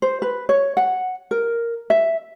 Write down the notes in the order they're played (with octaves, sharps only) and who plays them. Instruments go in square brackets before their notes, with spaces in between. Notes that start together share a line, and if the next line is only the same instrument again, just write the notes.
[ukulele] C5
B4
C#5
F#5
A#4
E5